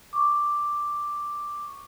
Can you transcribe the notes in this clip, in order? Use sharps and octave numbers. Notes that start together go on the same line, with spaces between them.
C#6 D6